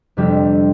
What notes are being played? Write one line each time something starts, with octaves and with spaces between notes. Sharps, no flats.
F2 C3 G3 D4 G4